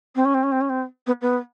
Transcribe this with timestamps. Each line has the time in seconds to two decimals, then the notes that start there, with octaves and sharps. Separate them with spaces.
0.15 C4
0.25 C#4
0.34 C4
0.43 C#4
0.52 C4
0.61 C#4
0.69 C4
1.06 B3
1.21 B3